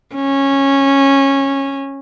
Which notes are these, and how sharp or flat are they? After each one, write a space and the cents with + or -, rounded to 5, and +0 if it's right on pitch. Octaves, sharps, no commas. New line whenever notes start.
C#4 -15